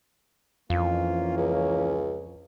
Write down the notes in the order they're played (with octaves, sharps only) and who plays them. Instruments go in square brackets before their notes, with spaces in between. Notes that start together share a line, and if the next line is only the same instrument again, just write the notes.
[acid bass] F2 [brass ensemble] E3 A#3 C#4 [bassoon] F4
[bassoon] C#2